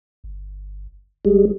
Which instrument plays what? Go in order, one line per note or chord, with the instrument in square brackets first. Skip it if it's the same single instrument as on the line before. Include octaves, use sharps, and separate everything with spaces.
[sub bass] G1
[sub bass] G1 [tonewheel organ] G3 G#3